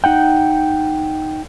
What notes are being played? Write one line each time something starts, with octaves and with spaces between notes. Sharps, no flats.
D#4 F#5 G5